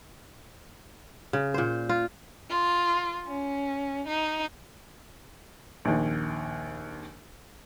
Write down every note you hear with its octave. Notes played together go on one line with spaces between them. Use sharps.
C#3
A#2 C5
F4
F4
C#4
D#4
A#1 D#2